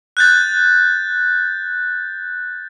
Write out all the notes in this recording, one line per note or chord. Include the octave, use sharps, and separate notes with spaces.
F#6 G6 A6